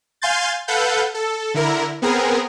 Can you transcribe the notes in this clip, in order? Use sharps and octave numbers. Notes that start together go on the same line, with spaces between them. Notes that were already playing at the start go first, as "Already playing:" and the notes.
F5 G#5 C6 G6 A6
A4 B4 F5 F#5 G6
A4
D3 E4 A#4
B3 C4 G#4 A#4